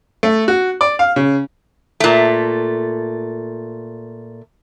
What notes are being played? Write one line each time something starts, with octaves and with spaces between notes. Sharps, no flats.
A3
F#4
D5
F5
C#3
A#2 A3